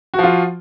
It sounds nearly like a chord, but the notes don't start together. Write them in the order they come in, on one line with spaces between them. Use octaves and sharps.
F#4 F3 F4